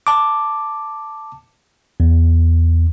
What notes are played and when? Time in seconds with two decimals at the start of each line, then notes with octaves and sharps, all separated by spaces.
0.07 A5 D6
2.00 E2